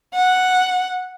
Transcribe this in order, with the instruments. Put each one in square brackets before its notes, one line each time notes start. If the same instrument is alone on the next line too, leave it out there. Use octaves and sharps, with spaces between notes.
[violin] F#5